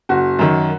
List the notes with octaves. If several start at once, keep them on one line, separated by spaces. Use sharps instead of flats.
F#1 F#4
F#2 D#3